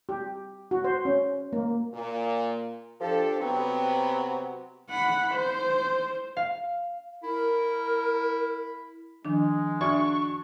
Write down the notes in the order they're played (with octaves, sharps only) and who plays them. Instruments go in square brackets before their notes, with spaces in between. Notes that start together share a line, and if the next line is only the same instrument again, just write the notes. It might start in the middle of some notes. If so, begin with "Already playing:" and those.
[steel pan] G4
F#4
C5
C#4
A#3
[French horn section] A#2
[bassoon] F3 [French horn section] D4 G4 A4
[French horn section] C3 F#3 B3 [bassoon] C4
[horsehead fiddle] F#5 B5
C5
[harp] F5
[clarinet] E4 [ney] A#4
[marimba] D#3 F3 D4 [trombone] G#3
[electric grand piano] D4 F#4 G#6 [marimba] E5 F6 [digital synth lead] C#6